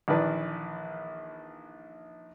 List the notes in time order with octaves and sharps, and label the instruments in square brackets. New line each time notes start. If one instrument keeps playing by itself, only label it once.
[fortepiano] A#1 D#3 E3 B4 D5 A5